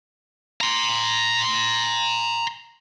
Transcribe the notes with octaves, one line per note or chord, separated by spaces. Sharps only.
A#5 C6